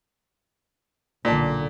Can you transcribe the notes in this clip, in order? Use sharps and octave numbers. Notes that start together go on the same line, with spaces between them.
B1 A#2 D3 D5 A5